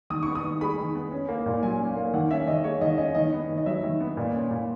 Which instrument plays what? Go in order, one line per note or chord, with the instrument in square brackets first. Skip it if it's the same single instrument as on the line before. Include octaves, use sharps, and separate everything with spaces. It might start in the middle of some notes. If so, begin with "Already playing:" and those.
[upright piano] D#3 D#6
B3 C#6
D#6
D#3
G#3 B5
D#3
B3
C#4
A#3
A#2
F#3 G#5
C#4
A#3
D#3 F#5
C#4 E5
D#3 D#5
G#3 C#5
D#3 D#5
C#4 D#5
D#3 D#5
B3
D#3
D#5
F#3 E5
D#3
B3
A#2
C#4
A#2